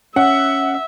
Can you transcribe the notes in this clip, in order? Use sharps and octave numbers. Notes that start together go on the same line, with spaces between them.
C#4 E5 F#5